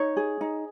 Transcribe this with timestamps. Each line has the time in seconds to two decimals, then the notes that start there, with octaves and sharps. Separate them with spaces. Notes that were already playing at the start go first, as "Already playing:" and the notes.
Already playing: D#4 C#5
0.17 G#4
0.41 D#4